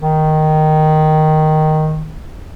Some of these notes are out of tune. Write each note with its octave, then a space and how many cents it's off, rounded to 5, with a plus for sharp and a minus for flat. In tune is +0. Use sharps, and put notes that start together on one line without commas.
D#3 -5